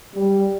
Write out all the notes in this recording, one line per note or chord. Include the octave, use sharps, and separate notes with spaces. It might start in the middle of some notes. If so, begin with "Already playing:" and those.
G3